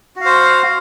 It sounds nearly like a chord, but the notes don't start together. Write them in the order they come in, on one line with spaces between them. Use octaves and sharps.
F#4 F5 C5